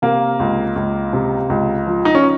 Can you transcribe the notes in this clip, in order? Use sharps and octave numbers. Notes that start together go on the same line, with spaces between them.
C3 A#3
C#2
C#2
C3
C#2
F3
D#4
C#4